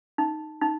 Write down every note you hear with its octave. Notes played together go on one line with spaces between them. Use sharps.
D#4
D#4